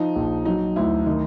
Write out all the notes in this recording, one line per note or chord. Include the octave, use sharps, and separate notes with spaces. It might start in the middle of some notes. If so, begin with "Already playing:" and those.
Already playing: F3 D#4
A#1
F#3 D#4
D2 E4
D#3 D#4